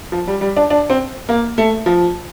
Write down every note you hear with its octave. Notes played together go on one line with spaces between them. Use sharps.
F3
G3
G3
D4
D4
C4
A#3
A3
F3